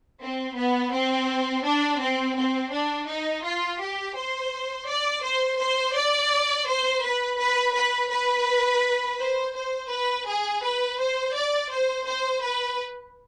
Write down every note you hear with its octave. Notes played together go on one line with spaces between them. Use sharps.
C4
B3
C4
D4
C4
C4
D4
D#4
F4
G4
C5
D5
C5
C5
D5
C5
B4
B4
B4
B4
C5
C5
B4
G#4
B4
C5
D5
C5
C5
B4